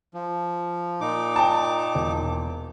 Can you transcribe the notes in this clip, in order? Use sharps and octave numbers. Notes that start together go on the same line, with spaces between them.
F3
A#2 D#4 D6
G5 A5
E1